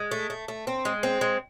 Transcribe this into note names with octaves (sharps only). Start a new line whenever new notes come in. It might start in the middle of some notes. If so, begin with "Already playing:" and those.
Already playing: G#3
A3
A3
A3
C4
G#3
C4
G#3